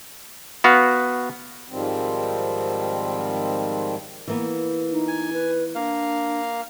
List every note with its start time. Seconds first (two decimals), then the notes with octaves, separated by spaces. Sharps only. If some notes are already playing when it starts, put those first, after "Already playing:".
0.64 B3 F#4 F5
1.70 G#2 D#3 F3 G3 C4
4.28 E3 A#3 B3
4.92 D#4
5.08 G#5
5.33 B4
5.75 A#3 D4 F5